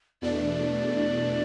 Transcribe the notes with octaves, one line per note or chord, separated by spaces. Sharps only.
E2 B2 A3 D4 D5